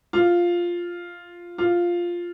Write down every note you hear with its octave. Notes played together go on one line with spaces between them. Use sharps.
F4
F4